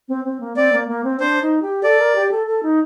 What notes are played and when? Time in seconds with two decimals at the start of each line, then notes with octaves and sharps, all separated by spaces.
0.08 C4
0.25 C4
0.40 A#3
0.56 C4 D5
0.72 A#3
0.88 A#3
1.04 C4
1.20 D4 C5
1.41 D#4
1.62 G4
1.83 A4 D5
1.99 A#4
2.15 G4
2.31 A4
2.47 A4
2.63 D#4